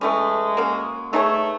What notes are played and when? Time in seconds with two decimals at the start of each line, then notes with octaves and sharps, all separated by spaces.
0.01 E3 G#3 A3 C#4
0.57 A#3 C#4 F#4
1.13 A3 B3 D#4 G#4 C#5